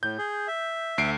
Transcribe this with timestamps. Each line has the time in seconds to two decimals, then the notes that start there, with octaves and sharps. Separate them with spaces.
0.03 A2 G6
0.18 G#4
0.48 E5
0.98 D2 C7 D7